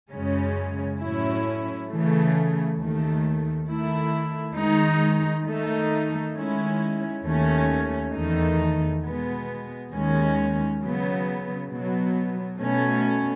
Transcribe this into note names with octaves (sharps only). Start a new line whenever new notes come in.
F#2 C#3 G#3 C#4
A2 F#3 C#4 E4
C#3 E3 A3
D#2 D#3 A3
D#3 A3 E4
D#3 G#3 D#4
D#3 A3 D#4
D#3 G#3 C#4 E4
D#2 D#3 A3 C#4
E2 D#3 A3 D#4
B2 G#3 B3
D#2 D#3 G#3 C#4
C#3 F#3 B3
B2 F#3 B3
B2 A3 C#4